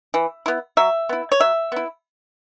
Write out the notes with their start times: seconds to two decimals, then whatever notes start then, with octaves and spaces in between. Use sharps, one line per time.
0.14 E3
0.46 B3 E4
0.77 F#3 E5
1.09 B3 E4
1.32 C#5
1.40 F#3 E5
1.72 B3 E4